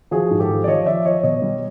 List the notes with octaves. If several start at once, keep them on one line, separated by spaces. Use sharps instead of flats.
F3 F#4 G#4
G#2
G4 A4
F3
D5
F3 C#5 D#5
F3 D5 E5
F3 C#5 D#5
B2 C#5 D#5
G3